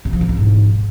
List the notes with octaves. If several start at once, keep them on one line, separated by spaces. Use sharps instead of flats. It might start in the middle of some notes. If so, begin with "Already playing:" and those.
C3
F3
C3
A#2
G#2